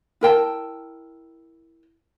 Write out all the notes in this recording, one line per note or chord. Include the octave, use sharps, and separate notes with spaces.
E4 A#4 G5 A5